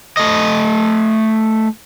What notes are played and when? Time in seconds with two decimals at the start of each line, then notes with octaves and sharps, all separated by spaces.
0.17 A3 D#5